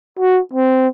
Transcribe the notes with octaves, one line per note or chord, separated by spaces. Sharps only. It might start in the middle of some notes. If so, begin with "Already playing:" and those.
F#4
C4